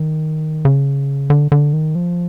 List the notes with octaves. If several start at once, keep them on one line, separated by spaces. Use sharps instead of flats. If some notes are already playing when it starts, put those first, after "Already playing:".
Already playing: D#3
C#3
D3
D3
D#3
F3